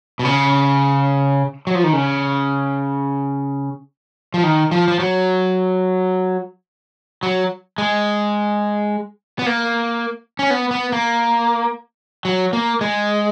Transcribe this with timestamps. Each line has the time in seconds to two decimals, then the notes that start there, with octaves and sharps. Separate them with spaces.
0.19 B2
0.25 C#3
1.67 F#3
1.75 F3
1.84 D#3
1.93 C#3
4.34 F3
4.43 D#3
4.71 F3
4.88 F3
5.00 F#3
7.23 F#3
7.78 G#3
9.39 B3
9.46 A#3
10.39 C#4
10.50 B3
10.71 B3
10.92 A#3
12.25 F#3
12.53 A#3
12.81 G#3